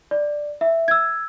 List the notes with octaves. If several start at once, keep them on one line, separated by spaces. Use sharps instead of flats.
D5
E5
E6 G#6